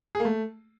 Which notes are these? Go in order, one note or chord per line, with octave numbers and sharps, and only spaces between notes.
G#4
A#3
A3